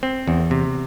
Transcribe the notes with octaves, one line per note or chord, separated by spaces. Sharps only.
C4
E2
C3